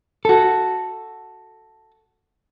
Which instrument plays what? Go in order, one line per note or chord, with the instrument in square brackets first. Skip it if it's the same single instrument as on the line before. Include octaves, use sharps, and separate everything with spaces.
[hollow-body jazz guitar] F#4 A4